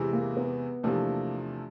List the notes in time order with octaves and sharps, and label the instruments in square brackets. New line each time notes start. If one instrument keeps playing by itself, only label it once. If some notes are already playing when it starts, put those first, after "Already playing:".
Already playing: [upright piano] E2 C3 E3 G#3
[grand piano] A#3
B3
[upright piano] E2 C3 F3 A3 D4 [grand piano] A#3